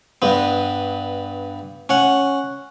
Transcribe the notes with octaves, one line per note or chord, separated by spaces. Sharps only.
G2 B3
C#4 F#5